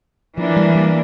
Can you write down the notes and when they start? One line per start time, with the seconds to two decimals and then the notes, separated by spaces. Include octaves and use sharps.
0.37 E3 F3 A#3 D4
0.57 G3
0.75 G3